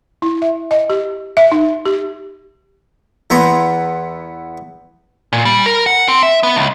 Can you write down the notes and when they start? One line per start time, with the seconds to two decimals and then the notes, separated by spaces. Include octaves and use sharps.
0.22 E4
0.42 E5
0.71 D#5
0.90 G4
1.37 E5
1.52 D#4
1.85 G4
3.30 E2 B3 A#5 C6
5.33 A#2
5.45 G3
5.66 A#4
5.86 F#5
6.08 C4
6.23 E5
6.43 B3
6.56 C#2